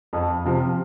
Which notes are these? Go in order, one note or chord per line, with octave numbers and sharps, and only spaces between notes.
F2
C3 F3